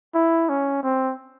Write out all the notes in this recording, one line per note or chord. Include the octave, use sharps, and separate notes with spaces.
E4
C#4
C4